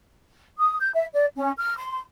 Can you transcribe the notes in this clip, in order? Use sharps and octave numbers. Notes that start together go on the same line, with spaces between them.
D#6
G6
E5
D5
C#4
F6
C6